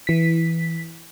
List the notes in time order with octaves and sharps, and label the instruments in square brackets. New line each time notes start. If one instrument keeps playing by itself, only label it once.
[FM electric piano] E3 B6